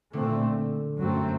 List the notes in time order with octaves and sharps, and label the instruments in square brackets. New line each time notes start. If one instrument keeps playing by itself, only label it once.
[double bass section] A#2 A3 C4 [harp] D3
[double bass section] F#2 F#3 A3 C4